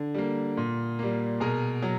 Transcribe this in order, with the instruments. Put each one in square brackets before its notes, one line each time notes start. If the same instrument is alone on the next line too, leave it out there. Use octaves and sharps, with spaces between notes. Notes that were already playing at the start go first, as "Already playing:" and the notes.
Already playing: [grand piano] D3
G3 A#3
A#2
G3 A#3
B2 G#4 A#4
F#3